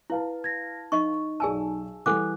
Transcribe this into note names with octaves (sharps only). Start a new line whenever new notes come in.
E4 B4 F5 A5
G#6 A#6
D#4 D#5 C#6
B1 G#4 D5 G#5 A5 E6
E3 G3 A4 F#5 G#5 D6 F#6